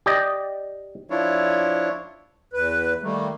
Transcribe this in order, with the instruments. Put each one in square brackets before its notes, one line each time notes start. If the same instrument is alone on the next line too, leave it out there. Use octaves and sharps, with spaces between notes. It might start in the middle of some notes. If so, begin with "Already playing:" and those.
[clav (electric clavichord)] G4 D5 D#5
[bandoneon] F3 D4 E4 F4 C#5
[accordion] E2 B4
D#3 G3 A3 A#3